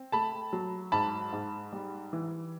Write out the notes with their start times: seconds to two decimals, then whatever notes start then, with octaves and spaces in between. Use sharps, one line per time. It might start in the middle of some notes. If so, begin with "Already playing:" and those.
Already playing: C4
0.12 A3 A5 B5
0.53 F#3
0.92 G#2 A5 B5
1.32 G#2
1.73 G3
2.13 E3